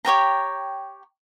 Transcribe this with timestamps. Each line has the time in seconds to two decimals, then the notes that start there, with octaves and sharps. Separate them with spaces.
0.05 G4 C#5 G5 A#5